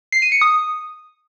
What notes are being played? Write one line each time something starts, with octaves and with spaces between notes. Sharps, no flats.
C7
D#7
C#7
D#6